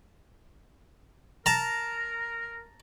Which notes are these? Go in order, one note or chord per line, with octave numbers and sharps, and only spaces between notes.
A#4 A5 A#5